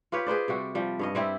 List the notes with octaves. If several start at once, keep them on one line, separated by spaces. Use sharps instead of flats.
F4 G4 B4 C#5
G#4 B4 C5 D5
C3 G3 F#4
F3 G3
G2 C#4 D#5
G3 C4 E4